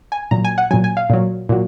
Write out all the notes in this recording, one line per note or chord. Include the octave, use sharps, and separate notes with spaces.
G#5
A#2 F#3 A#5
G#5
F#5
A#2 F#3 G#5
G#5
F5
A#2 F#3
A#2 F#3